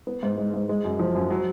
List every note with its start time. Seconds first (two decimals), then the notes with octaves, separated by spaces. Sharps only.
0.07 B3
0.23 G#2
0.38 G#3
0.54 G#2
0.69 G#3
0.85 F#2
0.99 F3
1.15 F#2
1.30 F#3